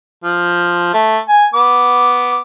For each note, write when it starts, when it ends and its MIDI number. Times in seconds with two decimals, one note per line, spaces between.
0.24 0.93 53
0.94 1.18 57
1.29 1.46 80
1.54 2.39 59
1.54 2.39 86